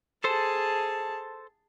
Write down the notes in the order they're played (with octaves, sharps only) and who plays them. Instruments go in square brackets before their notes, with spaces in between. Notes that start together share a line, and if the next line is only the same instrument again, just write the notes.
[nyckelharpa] G#4 A5 [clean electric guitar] A4 C5